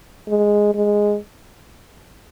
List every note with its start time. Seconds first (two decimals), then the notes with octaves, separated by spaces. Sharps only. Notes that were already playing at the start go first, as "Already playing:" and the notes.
0.28 G#3
0.75 G#3